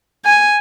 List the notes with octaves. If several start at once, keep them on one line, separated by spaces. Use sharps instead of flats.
G#5